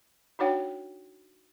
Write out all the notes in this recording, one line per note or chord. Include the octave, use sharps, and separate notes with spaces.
D4 D#4 F#4 C#5 F#5 G5